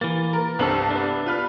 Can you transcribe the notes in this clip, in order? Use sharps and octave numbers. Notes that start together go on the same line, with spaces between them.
E3 A#3 A6
A#4
C2 G2 B3 C4 A4 F#7
B3 D4
F4 B4 F6